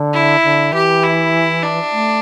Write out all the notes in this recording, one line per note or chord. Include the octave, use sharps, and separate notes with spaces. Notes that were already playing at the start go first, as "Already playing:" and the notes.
Already playing: D3
E4
D3
E3 G4
E4
D4
A3